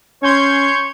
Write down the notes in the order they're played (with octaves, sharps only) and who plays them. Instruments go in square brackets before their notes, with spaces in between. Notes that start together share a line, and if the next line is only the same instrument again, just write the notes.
[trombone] C#4 [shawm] C#5 [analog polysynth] C6 G6 G#6